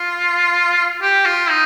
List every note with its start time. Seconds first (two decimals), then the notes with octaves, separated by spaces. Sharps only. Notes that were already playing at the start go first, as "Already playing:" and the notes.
Already playing: F4
1.02 G4
1.25 F4
1.50 D#4